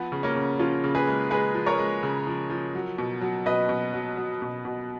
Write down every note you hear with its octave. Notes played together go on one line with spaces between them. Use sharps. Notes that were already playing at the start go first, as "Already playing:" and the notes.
Already playing: F3 B3
C#3
A#3 C#4
C#3
F3 C#4 F4
C#3
G#4 B4
G#3
G#3 G#4 B4
F3
A#4 C#5
G#3
C#3
F3
F3
F#3
B2
F#3
B2 B4 D#5
B2
F#3
F#3
B2
B2